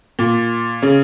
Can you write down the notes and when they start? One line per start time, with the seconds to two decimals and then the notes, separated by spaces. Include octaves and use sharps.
0.19 A#2
0.83 C#3